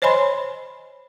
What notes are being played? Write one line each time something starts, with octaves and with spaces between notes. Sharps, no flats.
C5 C#5 D#5 G#5 B5 C6